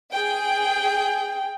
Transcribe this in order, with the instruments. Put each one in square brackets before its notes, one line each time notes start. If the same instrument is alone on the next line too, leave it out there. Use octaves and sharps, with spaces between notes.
[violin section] G#4 G5